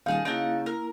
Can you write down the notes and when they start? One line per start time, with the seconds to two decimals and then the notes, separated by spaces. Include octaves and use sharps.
0.06 D#1 D#4 G#4 F5 A5
0.25 C#3 A#3 D#4 E4 F#4 A5
0.66 A#4